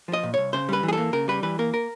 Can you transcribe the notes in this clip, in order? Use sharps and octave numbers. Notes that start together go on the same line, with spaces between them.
F3
D#5
A#2
C2 C#5
C#3 C5
G3 B4
E3
G#4
A4
A#3
C#3 A#4
G3 B4
E3 B4
A#3 A#4
A#4